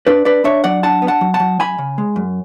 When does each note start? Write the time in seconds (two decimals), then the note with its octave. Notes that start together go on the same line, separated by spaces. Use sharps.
0.07 D4 B4 D5
0.25 D4 B4 D5
0.44 D4 C#5 E5
0.64 F#3 D5 F#5
0.83 D4 F#5 A5
1.02 B3
1.08 F#5 A5
1.21 F#3
1.34 F#5 A5
1.40 F#3
1.59 F#2 G#5 B5
1.78 C#3
1.98 G#3
2.16 F#2